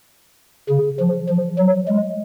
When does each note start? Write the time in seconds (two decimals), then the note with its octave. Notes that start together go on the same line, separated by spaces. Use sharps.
0.69 C#3
0.99 F3
1.28 F3
1.58 F#3
1.88 G#3